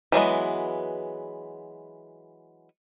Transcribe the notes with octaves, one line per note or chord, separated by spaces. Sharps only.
E3 F#3 G#3 B3